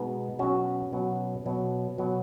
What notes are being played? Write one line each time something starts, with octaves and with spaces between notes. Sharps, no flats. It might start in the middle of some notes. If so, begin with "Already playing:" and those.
Already playing: B2 G#3 B3 D#4
B2 F#3 C#4 F#4
B2 F#3
B2 F#3
B2 F#3